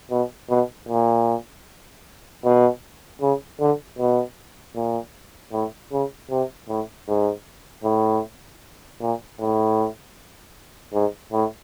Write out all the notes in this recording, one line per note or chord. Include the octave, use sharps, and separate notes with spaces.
B2
B2
A#2
B2
C#3
D3
B2
A#2
A2
C#3
C3
A2
G#2
A2
A#2
A2
G#2
A2